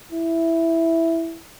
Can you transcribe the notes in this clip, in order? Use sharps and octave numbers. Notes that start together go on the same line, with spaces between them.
E4